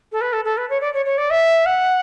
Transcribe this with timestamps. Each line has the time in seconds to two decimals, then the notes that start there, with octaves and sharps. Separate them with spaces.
0.12 A4
0.21 B4
0.33 A4
0.45 A4
0.57 B4
0.70 C#5
0.81 D5
0.94 C#5
1.05 C#5
1.18 D5
1.30 E5
1.66 F#5